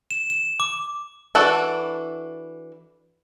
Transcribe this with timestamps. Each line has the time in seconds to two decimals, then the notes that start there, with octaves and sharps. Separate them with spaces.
0.11 E7
0.30 E7
0.60 D6
1.35 E3 D4 F#4 A4 F#5